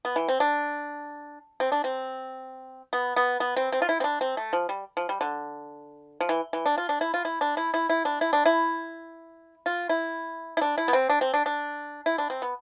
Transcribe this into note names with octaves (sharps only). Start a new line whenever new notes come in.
B3
E3
C4
D4
C4
D4
C4
B3
B3
B3
C4
C4
F4
E4
C4
D4
C4
A3
F3
G3
F3
G3
D3
F3
E3
E3
D4
F4
D4
E4
F4
E4
D4
E4
E4
E4
D4
E4
D4
E4
F4
E4
E4
D4
E4
B3
C4
D4
C4
D4
D4
E4
D4
C4
B3